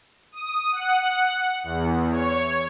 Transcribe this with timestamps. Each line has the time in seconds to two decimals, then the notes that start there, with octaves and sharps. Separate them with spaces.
0.32 D#6
0.72 F#5
1.63 E2
2.11 C#5